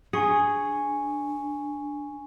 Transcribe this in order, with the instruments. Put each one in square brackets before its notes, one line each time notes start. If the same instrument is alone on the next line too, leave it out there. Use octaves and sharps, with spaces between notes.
[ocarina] D4 [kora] G#4 [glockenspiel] G#5 C#6 C#7